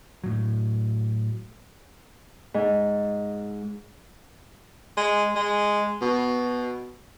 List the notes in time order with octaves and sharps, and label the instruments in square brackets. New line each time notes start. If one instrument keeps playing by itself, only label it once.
[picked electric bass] A2 F#3
[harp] G#2
[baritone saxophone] G#3
G#3
B2